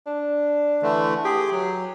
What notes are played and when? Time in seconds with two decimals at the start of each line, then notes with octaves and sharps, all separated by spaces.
0.07 D4
0.83 D3 E3 A3
1.25 G4 G#4
1.51 F#3